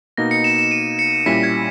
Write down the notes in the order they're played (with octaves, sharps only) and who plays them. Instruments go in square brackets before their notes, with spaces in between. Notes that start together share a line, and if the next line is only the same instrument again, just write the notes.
[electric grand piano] B2 A#3 D#4 [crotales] A#6
[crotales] C#7
E7
E7
D#7
C#7
[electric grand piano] A#2 G3 C#4 E4 [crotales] B6
[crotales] G#6